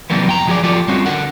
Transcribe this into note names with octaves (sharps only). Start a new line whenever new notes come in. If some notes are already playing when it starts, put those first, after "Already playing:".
C3 E3 F#3 G3 A#3 B3
F2 G5 A#5
F3 F#3 G#4 A#4 D5
F3 F4 G4 A4 D5
G3 C4 C#4 F4 F#4
D3 A#4 F#5